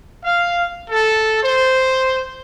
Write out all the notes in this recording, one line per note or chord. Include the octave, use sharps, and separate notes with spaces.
F5
A4
C5